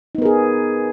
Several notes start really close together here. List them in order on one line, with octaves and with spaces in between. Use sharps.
D#4 B3 A#4 G#4